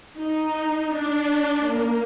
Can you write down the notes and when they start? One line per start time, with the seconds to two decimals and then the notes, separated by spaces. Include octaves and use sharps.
0.17 D#4
0.93 D4
1.71 A#3